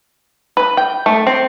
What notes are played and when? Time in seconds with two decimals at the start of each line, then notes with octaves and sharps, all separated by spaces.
0.57 B4
0.77 G5
1.06 A3
1.27 C4